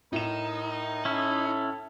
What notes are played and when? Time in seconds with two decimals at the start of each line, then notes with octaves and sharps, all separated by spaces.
0.13 A2 D#4 A#4 E5 E7
1.05 C#4 E4 A4